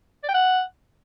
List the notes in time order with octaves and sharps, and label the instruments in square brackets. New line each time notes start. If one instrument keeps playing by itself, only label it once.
[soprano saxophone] D5
G5
F#5